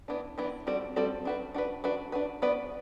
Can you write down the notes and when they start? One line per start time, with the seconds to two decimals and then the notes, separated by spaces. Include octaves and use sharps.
0.08 E3 B3 D4
0.38 E3 B3 D4
0.67 G3 C4 F#4 A4 D5
0.96 G3 C4 F#4 A4 D5
1.25 D4 F#4 B4
1.54 D4 F#4 B4
1.84 D4 F#4 B4
2.12 D4 F#4 B4
2.42 B3 F#4 B4 D5